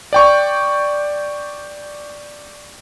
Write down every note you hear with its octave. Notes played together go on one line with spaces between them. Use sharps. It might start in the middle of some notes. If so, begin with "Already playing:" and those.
D5 G5 C#6